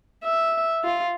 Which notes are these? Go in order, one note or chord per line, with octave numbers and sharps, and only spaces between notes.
E5
F4